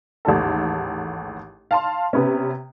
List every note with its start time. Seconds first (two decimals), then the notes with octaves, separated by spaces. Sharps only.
0.25 A1 D#2 G#2 A4
1.71 F5 A5 C6
2.13 C3 B3 C#4